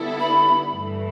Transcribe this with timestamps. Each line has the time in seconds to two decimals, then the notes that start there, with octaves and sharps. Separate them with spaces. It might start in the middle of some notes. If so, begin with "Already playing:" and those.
Already playing: D3 G3 B3 E4 A4
0.20 B5
0.72 G2 E3 A3